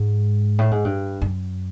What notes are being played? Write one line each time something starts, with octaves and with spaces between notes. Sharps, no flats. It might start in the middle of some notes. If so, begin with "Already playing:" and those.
Already playing: G#2
A2
G#2
G2
F#2